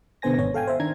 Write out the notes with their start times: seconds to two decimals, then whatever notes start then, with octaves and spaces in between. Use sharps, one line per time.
0.22 B2 D3 B3 C5 G#5 A#6
0.38 G#1 B3 C#5
0.54 A4 F5 G5 G#5
0.67 C5 E5
0.80 D#3 D4 A#5 G#6